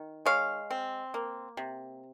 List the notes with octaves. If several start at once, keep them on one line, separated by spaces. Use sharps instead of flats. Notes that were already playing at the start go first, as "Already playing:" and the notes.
Already playing: D#3
G#3 C#5 F5
C4
A#3
C3